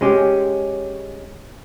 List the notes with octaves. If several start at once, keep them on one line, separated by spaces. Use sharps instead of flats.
G#3 C#4 G4